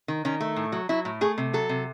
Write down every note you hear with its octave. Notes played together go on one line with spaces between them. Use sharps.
D#3
D#3 C#4
A3
A2
F#3
F#3 E4
A2
A3 G#4
C3
F#3 A4
C3